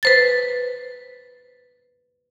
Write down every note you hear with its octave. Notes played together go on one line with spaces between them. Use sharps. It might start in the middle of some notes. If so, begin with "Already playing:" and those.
B4 C5 A6